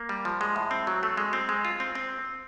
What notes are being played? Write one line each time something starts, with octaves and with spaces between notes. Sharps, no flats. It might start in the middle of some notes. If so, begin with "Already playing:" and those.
Already playing: A#3
G3
F3
G#3
A2
C4
F#3
A3
G#3
C4
G#3
F4
C4
C4